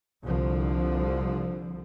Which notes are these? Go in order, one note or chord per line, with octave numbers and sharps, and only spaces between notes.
C2 D3 F3